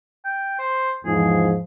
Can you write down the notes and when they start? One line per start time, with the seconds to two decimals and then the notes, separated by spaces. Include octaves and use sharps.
0.25 G5
0.59 C5
1.05 E2 G#2 F3 G#4